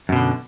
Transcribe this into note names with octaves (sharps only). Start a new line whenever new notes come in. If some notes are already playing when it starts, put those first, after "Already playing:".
F#2 B2 D3